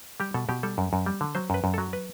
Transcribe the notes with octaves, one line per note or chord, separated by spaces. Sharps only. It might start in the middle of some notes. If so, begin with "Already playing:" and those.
G3 G4
B2 A4
B2 G4
G3 A4
F#2
F#2
G3
D3
F#3 C5
F#2 B4
F#2
F#3 A4
B4